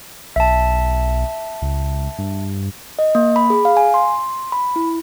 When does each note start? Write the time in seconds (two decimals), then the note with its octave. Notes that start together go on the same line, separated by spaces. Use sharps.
0.36 B1 E5 A5
1.62 C#2
2.18 G2
2.99 D#5
3.15 A#3
3.36 B5
3.50 G#4
3.65 F5
3.77 G#5
3.94 C6
4.52 B5
4.76 E4